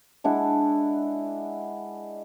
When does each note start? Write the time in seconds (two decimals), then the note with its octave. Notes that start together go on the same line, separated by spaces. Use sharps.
0.24 G#3 D4 E4 F#5